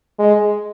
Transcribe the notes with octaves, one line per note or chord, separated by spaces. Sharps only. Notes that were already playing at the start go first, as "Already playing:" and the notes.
G#3